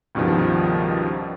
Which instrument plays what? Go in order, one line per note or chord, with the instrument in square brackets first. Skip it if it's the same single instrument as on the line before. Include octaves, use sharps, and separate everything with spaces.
[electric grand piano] C#2 G2 B2 D#3 F3